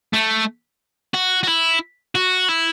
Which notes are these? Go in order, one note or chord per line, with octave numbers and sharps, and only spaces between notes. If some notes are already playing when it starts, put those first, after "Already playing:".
A3
F#4
F#4
E4
F#4
E4